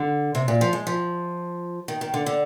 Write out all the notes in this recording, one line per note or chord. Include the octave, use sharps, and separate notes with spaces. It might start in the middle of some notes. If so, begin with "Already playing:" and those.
Already playing: D3
C3
A#2
F3
G#3
F3
D#3
D#3
D3
D3